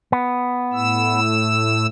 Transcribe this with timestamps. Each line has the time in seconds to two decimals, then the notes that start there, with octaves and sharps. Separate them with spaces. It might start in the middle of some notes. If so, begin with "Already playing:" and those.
0.12 B3
0.73 A2 E6